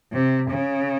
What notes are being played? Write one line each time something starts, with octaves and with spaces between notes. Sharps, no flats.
C3
C#3